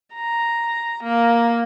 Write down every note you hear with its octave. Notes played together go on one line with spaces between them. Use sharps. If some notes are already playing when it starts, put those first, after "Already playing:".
A#5
A#3